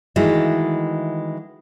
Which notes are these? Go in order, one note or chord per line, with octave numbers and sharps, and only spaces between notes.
D#3 E3 G#3 A3 F#4 E5